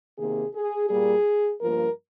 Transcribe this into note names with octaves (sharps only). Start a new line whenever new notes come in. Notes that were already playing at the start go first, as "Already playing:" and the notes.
C3 D#3 A#3 G#4
G#4
A#2 G3 A#3 G#4
G2 F3 A#3 A#4